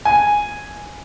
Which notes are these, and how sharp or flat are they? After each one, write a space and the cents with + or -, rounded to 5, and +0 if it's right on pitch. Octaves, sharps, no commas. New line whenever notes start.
G#5 -5